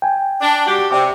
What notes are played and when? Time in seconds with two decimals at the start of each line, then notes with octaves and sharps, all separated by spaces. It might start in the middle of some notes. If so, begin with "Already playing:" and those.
0.02 G5 G#5
0.41 D4
0.67 G3 F#4 G4
0.91 C3 D5 G5 D6